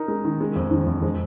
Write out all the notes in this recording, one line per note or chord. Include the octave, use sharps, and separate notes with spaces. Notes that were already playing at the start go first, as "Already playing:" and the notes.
Already playing: D#4 A#4
G#3
D#3
G#3
F2
D#3
F2
G#3